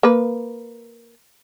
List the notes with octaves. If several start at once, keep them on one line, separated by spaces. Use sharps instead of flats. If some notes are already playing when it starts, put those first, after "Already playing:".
A#3 B4